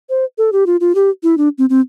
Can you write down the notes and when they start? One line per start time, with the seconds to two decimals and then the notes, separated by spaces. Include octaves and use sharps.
0.10 C5
0.38 A4
0.52 G4
0.66 F4
0.81 F4
0.95 G4
1.23 E4
1.38 D4
1.58 C4
1.70 C4